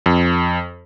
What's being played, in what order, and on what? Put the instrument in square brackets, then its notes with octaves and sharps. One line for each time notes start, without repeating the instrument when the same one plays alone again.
[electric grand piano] F2